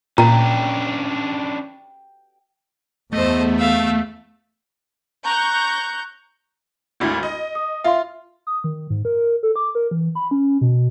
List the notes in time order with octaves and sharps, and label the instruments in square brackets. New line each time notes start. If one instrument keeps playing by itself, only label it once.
[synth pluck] A#2 [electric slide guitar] C#4 D4 B4 [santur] G5 [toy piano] A#5
[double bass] E2 B3 [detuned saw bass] A3 [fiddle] C5 D#5
[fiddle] E5 F5
[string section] A#5 C#6 F#6 G6
[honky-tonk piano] G#1 D2 E4
D#5
[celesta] D#6
[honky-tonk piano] F4 [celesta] E5 F5 C6
[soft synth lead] D#6
D#3
G#2
A#4
A4
D6
A#4
E3
B5
C#4
B2